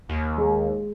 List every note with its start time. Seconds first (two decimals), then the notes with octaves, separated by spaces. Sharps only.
0.09 D#2
0.38 G#3